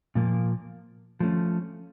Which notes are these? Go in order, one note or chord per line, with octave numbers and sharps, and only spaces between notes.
A#2 F3 A#3
F3 A3 C#4